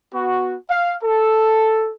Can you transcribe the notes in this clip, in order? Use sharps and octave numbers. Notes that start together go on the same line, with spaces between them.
B3 F#4
F5
A4